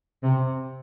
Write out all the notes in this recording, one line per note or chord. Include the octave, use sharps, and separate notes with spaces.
C3